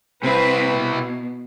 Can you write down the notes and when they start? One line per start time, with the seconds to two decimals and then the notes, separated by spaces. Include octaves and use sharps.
0.23 C3 C4 E4 B4
0.74 B2